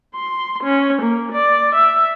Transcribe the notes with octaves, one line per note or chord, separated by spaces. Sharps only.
C6
C#4
A#3
D5
E5